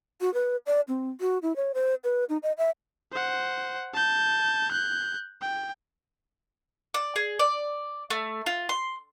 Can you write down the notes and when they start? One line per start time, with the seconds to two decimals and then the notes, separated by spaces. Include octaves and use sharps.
0.21 F#4
0.34 B4
0.66 D5
0.88 C4
1.21 F#4
1.42 E4
1.56 C#5
1.74 C5
2.04 B4
2.29 D#4
2.43 D#5
2.58 E5
3.12 C5 F#5
3.94 A5 G6
4.71 F#6 G6
5.41 G5
6.94 D5
7.16 G#4
7.39 D5
8.10 A3
8.46 F4
8.69 C6